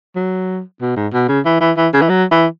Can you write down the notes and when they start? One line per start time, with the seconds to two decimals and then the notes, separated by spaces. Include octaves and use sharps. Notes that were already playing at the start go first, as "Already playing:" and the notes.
0.16 F#3
0.81 B2
0.96 G#2
1.13 B2
1.28 C#3
1.45 E3
1.61 E3
1.77 E3
1.93 C#3
2.02 E3
2.09 F#3
2.31 E3